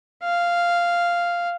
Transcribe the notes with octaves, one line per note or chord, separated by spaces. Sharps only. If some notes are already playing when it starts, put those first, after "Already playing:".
F5